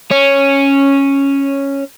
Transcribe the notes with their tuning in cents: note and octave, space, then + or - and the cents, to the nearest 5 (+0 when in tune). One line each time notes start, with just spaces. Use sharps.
C#4 -5